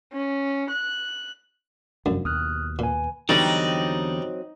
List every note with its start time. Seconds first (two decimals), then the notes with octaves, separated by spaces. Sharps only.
0.13 C#4
0.70 F#6
2.06 F1 F#2 D3 F3 F#3
2.25 D#2 B2 D#6 F6 F#6
2.79 A#2 B4 G#5
3.29 E2 D3 F#3 G3 C4 D#4 D5